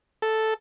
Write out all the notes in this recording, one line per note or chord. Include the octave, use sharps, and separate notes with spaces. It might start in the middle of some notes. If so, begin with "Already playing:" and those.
A4